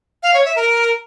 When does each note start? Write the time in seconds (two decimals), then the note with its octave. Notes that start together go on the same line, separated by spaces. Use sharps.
0.23 F5
0.34 C#5
0.45 E5
0.56 A#4